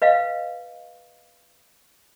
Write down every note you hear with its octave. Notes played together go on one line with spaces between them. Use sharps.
B4 D#5 F5